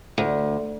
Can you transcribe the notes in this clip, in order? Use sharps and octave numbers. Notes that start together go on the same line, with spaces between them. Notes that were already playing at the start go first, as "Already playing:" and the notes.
D2